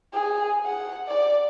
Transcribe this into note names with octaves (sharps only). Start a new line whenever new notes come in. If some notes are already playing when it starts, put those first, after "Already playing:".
G#4
F#5
D5